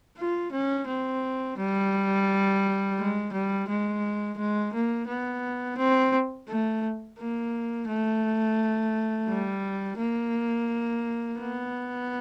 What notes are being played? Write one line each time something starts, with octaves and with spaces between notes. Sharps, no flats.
F4
C#4
C4
G3
G#3
G3
G#3
G#3
A#3
B3
C4
A3
A#3
A3
G3
A#3
B3